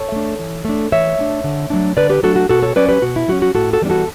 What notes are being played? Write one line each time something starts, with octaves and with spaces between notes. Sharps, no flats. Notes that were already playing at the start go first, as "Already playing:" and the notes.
Already playing: A4 C#5
A3 D4
E3
A3 D4
E3 C#5 E5
A3 D4
D3
F#3 A3 D4
D3 B4 D5
G4 B4
F#3 A3 D4 F#4 A4
F#4
B2 F#4 A4
A4 C#5
F#3 C#4 B4 D5
G4 B4
B2 F#4
E4
F#3 C#4 F#4
F#4
A2 F#4 A4
F#4 A4
E3 G3 B3 D4
F#4 A4